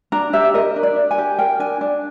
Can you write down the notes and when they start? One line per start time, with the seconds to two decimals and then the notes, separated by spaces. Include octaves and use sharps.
0.12 D4 A#5
0.33 G4 E5
0.54 A#4 D#5
0.76 D4
0.83 D5
0.96 D4
1.11 G#5
1.18 G4
1.39 A#4 G5
1.60 D4 G#5
1.81 D4